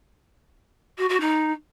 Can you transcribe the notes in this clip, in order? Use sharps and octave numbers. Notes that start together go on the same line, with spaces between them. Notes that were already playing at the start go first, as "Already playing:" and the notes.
F#4
F#4
D#4